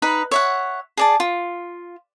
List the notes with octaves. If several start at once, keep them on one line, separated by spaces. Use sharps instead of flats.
D#4 B4 B5
C#5 E5 F#5
G#4 D5 A5
F4